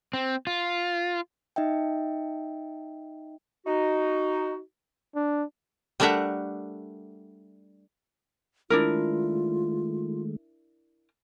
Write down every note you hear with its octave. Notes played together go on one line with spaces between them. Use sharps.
C4
F4
D#4 D#5 E5 G5
D#4 F#4
D4
G3 A3 D4 A#4 E5 F#5
D#3 G#3 A3 D4 E4 F4 A#4